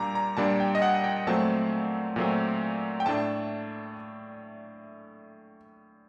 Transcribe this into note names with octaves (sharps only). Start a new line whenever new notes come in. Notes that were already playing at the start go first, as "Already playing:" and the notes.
Already playing: A#2 G3 D4 A#5 D6
A#5
A#2 G3 D4 A5
G5
D#5
F#5
G5
A#2 F#3 A3 C4 A5
A#2 F#3 A3 C4
G5
A2 A3 D4 A5